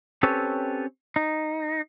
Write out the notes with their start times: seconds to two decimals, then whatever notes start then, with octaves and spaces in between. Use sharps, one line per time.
0.23 C4 C#4 G4 A4 B4 C#5
1.16 D#4